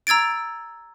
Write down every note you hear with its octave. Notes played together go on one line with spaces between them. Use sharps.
A#5 E6 G#6 A6 D7